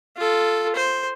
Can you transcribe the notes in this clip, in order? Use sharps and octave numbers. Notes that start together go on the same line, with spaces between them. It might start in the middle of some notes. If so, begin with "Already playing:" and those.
F4 A4
C5